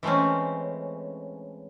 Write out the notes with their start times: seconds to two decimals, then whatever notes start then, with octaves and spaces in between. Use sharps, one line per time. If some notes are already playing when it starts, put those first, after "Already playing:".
0.03 E3 G#3 A3 C4 C#4